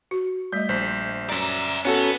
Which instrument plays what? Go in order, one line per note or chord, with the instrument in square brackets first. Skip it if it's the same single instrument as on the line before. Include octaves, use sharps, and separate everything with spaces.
[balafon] F#4
[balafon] G3 A3 D#5 [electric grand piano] G6 B6
[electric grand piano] A#1 C5 B6
[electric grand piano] F#2 A#5 [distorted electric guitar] D5 E5
[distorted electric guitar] B3 [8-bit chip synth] C#4 F#4 A4